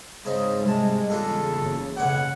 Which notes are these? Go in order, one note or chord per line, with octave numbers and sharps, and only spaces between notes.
G#2 C#3 C4 D#4
C2 G3 G#3 A5
E2 C#3 D4 F4 A4 A#5
F#1
B1 C#3 C#5 F#5 D6